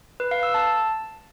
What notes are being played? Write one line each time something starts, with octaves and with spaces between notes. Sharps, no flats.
B4
F5
E6
A5